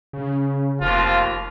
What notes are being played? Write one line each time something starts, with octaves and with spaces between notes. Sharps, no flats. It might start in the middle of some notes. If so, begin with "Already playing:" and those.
C#3
F1 D#2 F3 F4